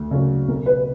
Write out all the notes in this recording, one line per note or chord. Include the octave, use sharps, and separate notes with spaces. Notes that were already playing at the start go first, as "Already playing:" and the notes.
Already playing: D2
C#3 F#3
B1 A#4
B4
B4